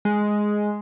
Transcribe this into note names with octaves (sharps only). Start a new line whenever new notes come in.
G#3